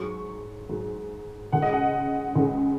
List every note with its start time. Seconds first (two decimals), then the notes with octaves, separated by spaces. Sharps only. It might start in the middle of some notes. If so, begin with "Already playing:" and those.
Already playing: G#2 F#3 C#6
0.69 G#2 F#3
1.52 C#2 C#3 G#3 F#5
1.62 D#5
1.73 F#5
2.36 C#2 C#3 G#3